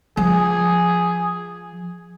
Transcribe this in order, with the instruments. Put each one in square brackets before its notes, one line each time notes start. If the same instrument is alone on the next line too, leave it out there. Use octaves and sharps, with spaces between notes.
[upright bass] F3 [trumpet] G#4